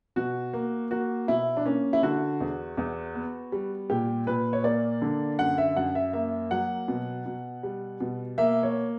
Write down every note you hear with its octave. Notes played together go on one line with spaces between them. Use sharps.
B2 F#4
A#3
A#3 F#4
B2 E4
D4
A#3 C#4
E4
D3 F#4
E2
E2
B3
G3
A#2 G4
A#2 B4
C#5
A#3 D5
D3
F#2 F#5
E5
F#2 F#5
E5
A#3 E5
F#3 F#5
B2
B2
G3
B2
A#3 E5
C#5